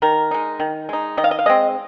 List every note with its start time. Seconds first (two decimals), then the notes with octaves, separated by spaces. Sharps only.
0.02 D#3 A#4
0.31 G#3 D#4
0.60 D#3
0.89 G#3 D#4
1.17 D#3 D#5
1.24 F5
1.31 D#5
1.39 F5
1.46 G#3 C4 D#5